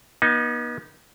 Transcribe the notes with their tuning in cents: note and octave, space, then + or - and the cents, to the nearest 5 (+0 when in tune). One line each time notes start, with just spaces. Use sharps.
B3 -40 D#4 +0